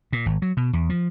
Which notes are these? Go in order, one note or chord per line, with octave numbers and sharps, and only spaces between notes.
A#2
G#1
F#3
B2
E2
F3